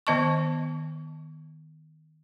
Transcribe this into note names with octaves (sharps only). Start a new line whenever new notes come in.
D#3 B3 D#5 A5 C#6